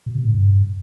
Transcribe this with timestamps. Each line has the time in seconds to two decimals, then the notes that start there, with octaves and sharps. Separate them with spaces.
0.06 B2
0.15 C3
0.25 A2
0.34 G2